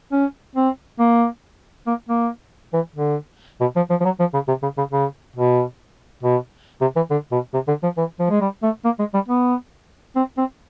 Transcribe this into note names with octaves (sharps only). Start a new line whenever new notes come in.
C#4
C4
A#3
A#3
A#3
E3
D3
B2
F3
F3
F3
F#3
F3
C#3
C3
C#3
C#3
C#3
B2
B2
C3
E3
D3
B2
C3
D3
F3
E3
F3
G#3
G3
A3
A#3
G#3
G3
B3
C4
C4